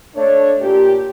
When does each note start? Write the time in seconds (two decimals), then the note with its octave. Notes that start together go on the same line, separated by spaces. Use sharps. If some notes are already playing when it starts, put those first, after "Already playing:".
0.15 A3 D4 C#5
0.61 A#2 G4